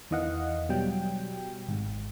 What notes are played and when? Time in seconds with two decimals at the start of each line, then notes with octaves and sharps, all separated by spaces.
0.11 E2 D#3 E3 D#5 F5 F#5
0.69 B2 F#3 G3 G5
1.68 G#1 G#2